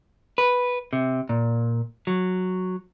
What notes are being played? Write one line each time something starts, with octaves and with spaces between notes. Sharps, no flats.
B4
C3
A#2
F#3